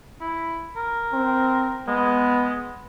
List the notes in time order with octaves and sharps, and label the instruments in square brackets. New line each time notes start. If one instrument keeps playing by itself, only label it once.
[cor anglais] E4
A#4
[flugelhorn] C4
[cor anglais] G#3 [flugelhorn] B3